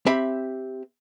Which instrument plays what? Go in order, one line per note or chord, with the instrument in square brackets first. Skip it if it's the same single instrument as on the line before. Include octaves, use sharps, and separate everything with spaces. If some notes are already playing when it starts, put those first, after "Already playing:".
[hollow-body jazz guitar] C4 G4 E5 B5